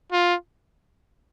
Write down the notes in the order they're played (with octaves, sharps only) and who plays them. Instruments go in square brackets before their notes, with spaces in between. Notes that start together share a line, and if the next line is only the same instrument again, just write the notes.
[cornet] F4